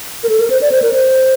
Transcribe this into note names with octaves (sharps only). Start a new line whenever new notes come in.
A#4
A4
A#4
C5
D5
C5
A#4
C5